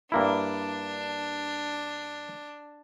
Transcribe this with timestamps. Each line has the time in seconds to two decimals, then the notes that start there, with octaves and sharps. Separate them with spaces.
0.12 G2 A#3 D4 E4